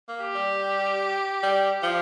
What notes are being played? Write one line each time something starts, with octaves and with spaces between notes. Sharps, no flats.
A#3
G4
G3
G3
F3